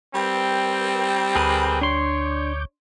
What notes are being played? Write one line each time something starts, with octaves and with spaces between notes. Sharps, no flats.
G3 C4 A#4 B4
D2 G#4 A#4 B4 D6 G6
D4 C#5 C6